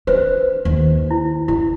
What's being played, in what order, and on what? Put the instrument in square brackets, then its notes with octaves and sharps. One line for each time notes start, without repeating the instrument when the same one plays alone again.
[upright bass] D4 [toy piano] B4 C5
[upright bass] D#2
[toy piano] E4
[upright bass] C#3 [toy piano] E4